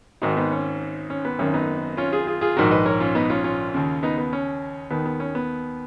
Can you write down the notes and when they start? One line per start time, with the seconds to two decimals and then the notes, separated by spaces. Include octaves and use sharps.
0.22 G#1 G#2 D#3 D#4 F#4
0.37 B3 D#4
0.52 C#4
1.10 C#4
1.25 B3
1.39 G#1 F#2 D#3 C#4
1.54 B3 D#4
1.97 C#4 F4
2.12 F4 G#4
2.27 F4 G#4
2.41 F4 G#4
2.57 A#1 G#2 D#3 F#4 A#4
2.71 B4 D#5
2.86 A#4 C#5
3.00 C#4 F4
3.15 B3 D#4
3.30 C#4 F4
3.44 C#4 F4
3.74 D#2 C#3
4.03 B3 D#4
4.18 B3
4.33 C#4
4.90 D#2 D#3 B3
5.06 B3
5.20 C#4
5.35 B3